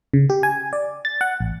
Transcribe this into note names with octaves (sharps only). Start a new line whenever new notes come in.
C#3
G4
G#5
D5
A6
F#5
A1